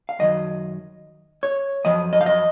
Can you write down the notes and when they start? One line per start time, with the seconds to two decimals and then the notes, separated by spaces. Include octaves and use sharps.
0.09 F5
0.19 F#2 D#3 F#3 D#5
1.43 C#5
1.84 F#2 F3 D#5
2.13 D#5
2.21 F5
2.26 D#5